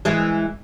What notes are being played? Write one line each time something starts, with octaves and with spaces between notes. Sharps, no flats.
E3 G#3